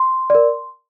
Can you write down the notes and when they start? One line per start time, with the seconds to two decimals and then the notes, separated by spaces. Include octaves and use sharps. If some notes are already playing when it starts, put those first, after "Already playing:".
Already playing: C6
0.30 A#4 D5